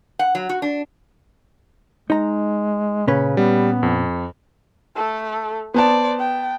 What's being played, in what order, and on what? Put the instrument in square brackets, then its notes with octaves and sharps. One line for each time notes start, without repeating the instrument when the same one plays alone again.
[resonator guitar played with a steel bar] F#5
F#3
F#4
D4
[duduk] G#3 [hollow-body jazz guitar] D#4 A#5
[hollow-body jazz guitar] A#2 C#4 B4 [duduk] C#3
[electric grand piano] G3 [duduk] B3
[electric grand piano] F2
[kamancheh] A3 A4
[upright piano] B3 A5 [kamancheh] C5 D5
[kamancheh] G5